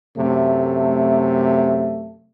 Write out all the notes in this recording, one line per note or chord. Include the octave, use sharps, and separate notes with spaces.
F#2 C3 A3